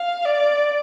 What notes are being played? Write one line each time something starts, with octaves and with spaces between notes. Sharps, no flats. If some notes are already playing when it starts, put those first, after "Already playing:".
Already playing: F5
D5